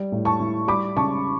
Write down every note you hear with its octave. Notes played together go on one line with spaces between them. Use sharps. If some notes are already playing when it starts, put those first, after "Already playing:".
Already playing: G3
A2
A5 C#6
E4
G3 B5 D6
C#3 A5 C#6